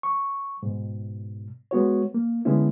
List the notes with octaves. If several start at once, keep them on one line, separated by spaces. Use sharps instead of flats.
C#6
G#2 B2
G#3 B3 F#4 C#5
A#3
D3 G#3 B3 C#4 E4